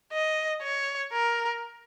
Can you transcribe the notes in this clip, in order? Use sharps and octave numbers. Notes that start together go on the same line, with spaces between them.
D#5
C#5
A#4